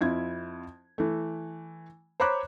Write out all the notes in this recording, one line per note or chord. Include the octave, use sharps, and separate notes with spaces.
F2 E4 F4 G#6
E3 A3
C5 C#5 A#5 B5 D6 F#6